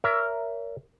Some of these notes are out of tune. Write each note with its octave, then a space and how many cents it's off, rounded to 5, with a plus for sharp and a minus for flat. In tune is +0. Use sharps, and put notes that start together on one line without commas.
A#4 +0 C#5 +35 E5 +20